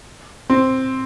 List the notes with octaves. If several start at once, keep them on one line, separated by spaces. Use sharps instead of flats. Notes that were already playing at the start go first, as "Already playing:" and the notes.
C4